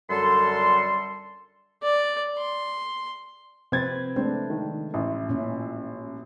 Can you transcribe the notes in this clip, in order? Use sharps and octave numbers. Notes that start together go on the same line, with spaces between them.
F#2 D3 G3 A4 C6
D5
C6
C3 F3 C4 B4 G#6 A6
G#3 A3 C4 D4
D#3
A1 E4
A#2 C#4 E5